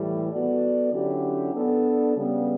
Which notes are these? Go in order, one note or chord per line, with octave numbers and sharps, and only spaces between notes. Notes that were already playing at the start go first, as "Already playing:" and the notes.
Already playing: A2 E3 G3
B3 F#4 A4 D5
D3 F#3 C#4 E4 G4
B3 D4 A4
C#3 G3 B3